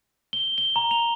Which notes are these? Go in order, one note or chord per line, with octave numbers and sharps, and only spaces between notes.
G7
G7
A#5
F7